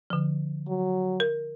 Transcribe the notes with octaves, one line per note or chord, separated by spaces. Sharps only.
D3 F3
F#3
A#4